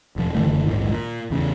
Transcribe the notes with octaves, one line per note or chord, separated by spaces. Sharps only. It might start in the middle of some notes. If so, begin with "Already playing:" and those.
E1 F3
F#1 D3 E3 A3
A#1 D#2 G#2
A#2
E2 C#3